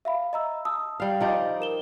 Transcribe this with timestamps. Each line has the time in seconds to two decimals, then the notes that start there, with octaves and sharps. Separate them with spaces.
0.05 E5 F5 B5
0.33 D#5 A#5 E6
0.65 A5 D#6 E6
1.00 G3 F5
1.20 F3 D#4 D5
1.60 A#4 E7 G7